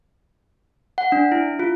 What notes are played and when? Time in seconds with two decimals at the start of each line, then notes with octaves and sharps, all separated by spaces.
0.98 F#5
1.12 D4
1.32 E4
1.59 F4